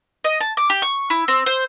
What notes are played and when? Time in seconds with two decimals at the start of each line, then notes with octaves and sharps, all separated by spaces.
0.24 D#5
0.40 A5
0.57 D6
0.70 G4
0.82 C#6
1.10 E4
1.28 C4
1.46 C5